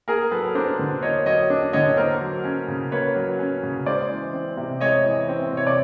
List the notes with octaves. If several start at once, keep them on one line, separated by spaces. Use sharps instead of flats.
A#3 G#4 A#4
F#3 A4 B4
D4 A#4 C5
D3
A#3 C#5 D#5
F#3 C#5 D#5
D4
D3 C#5 D#5
A#3 A#4 C5
F#3
C#4
C#3
A#3 B4 C#5
F#3
C#4
C#3
G#3 C5 D5
E3
C4
C3
G#3 C#5 D#5
E3
C4
C3 C#5
D5